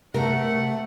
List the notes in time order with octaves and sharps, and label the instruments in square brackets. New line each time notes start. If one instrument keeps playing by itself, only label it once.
[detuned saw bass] C3 [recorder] A3 [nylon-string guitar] A#4 [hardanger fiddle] F#5